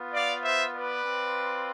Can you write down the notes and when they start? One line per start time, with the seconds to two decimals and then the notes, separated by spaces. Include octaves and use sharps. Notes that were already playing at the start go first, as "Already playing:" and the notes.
Already playing: B3 F4
0.14 D5 F5
0.44 C5 E5
0.74 B4 D5
1.05 C4 F4